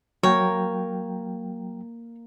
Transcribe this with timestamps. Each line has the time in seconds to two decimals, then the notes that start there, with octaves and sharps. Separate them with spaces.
0.23 F#3 A#3 C#5 G5